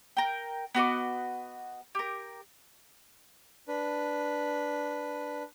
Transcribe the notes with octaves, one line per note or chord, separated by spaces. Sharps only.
A#4 G5
B3 F#4 D#5 D6
G4 A#4
D4 B4